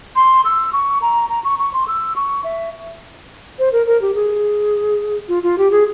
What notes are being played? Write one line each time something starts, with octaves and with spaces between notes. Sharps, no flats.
C6
E6
C#6
A#5
A#5
C#6
C#6
C6
E6
C#6
E5
C5
A#4
A#4
G4
G#4
F4
F4
G4
G#4